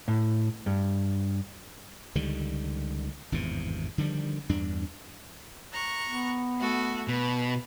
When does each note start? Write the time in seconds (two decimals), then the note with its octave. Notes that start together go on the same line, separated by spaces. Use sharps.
0.08 A2
0.66 G2
2.15 C#2 D3 D#3 G3
3.32 G#1 E2 G2 C3
3.98 D3 D#3 F3 G3
4.49 E2 G2 D4
5.72 A#5 C#6 F#6
6.08 B3
6.58 A3 F#4 A4
7.08 B2 B4